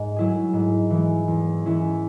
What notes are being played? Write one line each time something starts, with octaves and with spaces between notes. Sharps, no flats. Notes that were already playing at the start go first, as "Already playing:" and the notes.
Already playing: G#2
F#3 E4 G#4
G#2
E3
G#3
E2
E3 C#4 E4